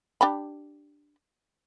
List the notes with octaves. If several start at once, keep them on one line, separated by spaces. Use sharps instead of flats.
D4 G4 B5